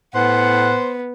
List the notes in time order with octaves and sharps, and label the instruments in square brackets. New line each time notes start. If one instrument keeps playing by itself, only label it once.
[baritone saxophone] A2 [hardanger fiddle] B3 [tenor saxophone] C5 [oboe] F#5